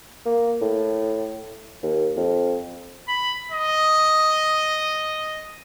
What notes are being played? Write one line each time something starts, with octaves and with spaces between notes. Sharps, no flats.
A#3
A2
D#2
F2
B5
D#5